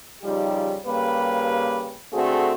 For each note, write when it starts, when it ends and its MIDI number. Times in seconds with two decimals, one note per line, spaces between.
0.23 0.76 49
0.23 0.76 53
0.23 0.76 55
0.23 0.76 63
0.23 0.76 67
0.86 1.99 49
0.86 1.99 55
0.86 1.99 58
0.86 1.99 67
0.86 1.99 71
2.12 2.53 50
2.12 2.53 57
2.12 2.53 60
2.12 2.53 66
2.12 2.53 68